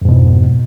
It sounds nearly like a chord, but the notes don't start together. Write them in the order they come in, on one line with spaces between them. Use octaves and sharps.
F2 G#2 B2